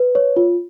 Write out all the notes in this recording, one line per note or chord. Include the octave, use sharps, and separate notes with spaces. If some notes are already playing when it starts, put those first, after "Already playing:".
Already playing: B4
C#5
F4